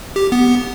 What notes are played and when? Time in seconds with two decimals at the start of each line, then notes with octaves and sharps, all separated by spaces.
0.16 G4
0.32 B3